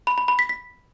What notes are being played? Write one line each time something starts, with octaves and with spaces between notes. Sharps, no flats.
B5
B5
B5
B6
B6